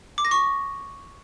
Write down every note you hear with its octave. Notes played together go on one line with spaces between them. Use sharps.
D6
A#6
C#6